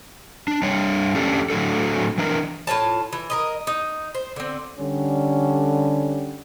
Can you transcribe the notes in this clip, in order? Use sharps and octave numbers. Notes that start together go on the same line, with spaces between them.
D4
G3 D4 C#5
E2 C#4 D4 G4 A4
A2 F#3 D4 A4
E3 D4 A#4
A2 F4 C#5 A5
E3
A#4 B4 D#5
D#4
C5
D3 C4
D3 G3 C#4